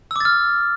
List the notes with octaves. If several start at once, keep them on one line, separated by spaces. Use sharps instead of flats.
D6 E6 F6 A6